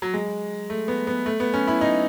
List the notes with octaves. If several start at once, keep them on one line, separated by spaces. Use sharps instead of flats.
F#3
G#3
A3
B3
B3
A3
B3
C#4
E4
D#4